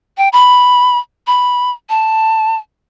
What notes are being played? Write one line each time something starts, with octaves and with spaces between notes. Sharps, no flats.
G5
B5
B5
A5